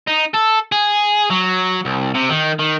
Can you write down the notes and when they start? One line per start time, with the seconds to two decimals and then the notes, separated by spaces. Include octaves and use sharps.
0.08 D#4
0.34 A4
0.72 G#4
1.30 F#3
1.85 C2
2.14 C3
2.29 D#3
2.59 D#3